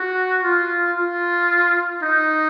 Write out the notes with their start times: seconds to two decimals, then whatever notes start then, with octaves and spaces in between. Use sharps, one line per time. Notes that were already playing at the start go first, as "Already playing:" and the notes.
Already playing: F#4
0.43 F4
0.97 F4
2.03 D#4